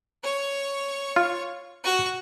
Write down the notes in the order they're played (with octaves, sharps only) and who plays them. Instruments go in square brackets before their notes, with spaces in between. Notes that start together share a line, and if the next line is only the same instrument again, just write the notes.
[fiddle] C#5 C#6
[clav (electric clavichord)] F4
[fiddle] F#4 C#6